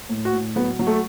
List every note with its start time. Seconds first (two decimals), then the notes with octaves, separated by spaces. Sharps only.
0.09 A2
0.25 F#4
0.32 A2
0.56 F#3 B3
0.79 F#3
0.87 A3